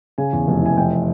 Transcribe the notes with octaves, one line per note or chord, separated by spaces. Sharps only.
C#3 G#5
E2
F1
E3 G#5
F1 G5